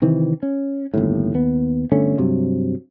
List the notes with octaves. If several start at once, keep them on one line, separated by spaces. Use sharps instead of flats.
C3 D#3 E3 C4
C#4
G1 D#2 A2
D#2 B3
G1 D3 A3 C#4
G2 C3 F#3